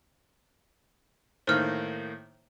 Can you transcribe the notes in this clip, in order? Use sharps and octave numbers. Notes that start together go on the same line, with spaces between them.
A2 D#3 A#3 C5 F6